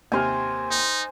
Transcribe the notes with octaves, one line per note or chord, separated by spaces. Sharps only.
D#2 C3 C5 G#5 F6
D#4